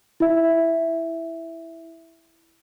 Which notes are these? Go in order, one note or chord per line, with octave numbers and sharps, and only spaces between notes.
E4 E5